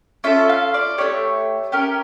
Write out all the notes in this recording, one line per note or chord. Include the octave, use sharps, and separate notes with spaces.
C#4 F4 A4 E5
F5
D5
A3 D4 G4 C#5
C#4 G4 A#4